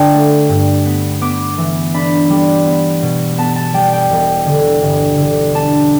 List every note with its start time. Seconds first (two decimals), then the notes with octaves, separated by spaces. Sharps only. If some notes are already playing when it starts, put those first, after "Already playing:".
Already playing: D3 D4 G5 A5
0.13 A3
0.49 G2
0.86 B3
1.21 B3 D6
1.58 E3
1.94 D4 B5
2.30 G3
2.66 B3
3.02 B2
3.38 B3 A5
3.56 A5
3.74 G3 G5
3.93 G5
4.10 E1
4.46 D3
4.82 G1
5.18 D3
5.54 D4 A5